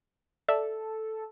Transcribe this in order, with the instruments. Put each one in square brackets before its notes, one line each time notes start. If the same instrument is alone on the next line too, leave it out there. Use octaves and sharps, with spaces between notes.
[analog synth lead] A4 [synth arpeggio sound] D5 E5 E6